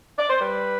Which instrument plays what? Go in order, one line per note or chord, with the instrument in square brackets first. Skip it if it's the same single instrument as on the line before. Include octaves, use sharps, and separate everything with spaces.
[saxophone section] D5
C5
G3 B4